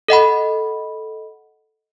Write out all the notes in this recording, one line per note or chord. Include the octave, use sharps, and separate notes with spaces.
A4 D#5 F#5 B5